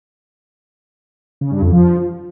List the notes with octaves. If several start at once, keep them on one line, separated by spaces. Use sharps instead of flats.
C#3
G2
F2
F3